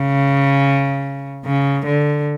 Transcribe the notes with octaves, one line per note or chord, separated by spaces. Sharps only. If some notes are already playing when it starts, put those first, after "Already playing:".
Already playing: C#3
C#3
D3